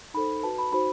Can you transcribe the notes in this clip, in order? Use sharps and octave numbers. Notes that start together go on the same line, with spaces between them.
D#4 A4 C5 B5
F#4 B4 A5
B5
D#4 F#4 C5 B5